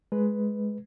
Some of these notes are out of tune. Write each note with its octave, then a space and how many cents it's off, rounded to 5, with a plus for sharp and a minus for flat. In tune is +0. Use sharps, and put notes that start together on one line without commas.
G#3 +10 B4 +0